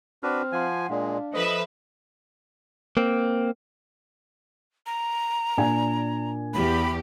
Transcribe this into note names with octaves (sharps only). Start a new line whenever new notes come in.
C4 D4 F#4 B4 F6
F3 F5 F#5 G#5 C6
A#2 G#3 D4 F5
F3 A4 B4 C5 D#5 E5
A#3 C4
A#5
A#2 D4 G#5
E2 G4 B5